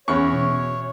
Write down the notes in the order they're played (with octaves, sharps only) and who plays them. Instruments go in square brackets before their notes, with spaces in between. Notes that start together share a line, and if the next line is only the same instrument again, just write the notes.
[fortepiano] E2 C#6 [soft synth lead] C#4 [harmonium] C#5
[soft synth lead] B2